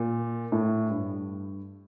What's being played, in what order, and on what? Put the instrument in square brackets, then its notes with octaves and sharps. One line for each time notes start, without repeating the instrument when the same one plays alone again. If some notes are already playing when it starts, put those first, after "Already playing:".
Already playing: [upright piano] A#2
A2
G2